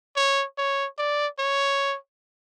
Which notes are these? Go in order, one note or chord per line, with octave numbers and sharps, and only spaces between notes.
C#5
C#5
D5
C#5